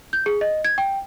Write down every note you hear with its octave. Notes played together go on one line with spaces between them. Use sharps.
G6
G#4
D#5
G#6
G5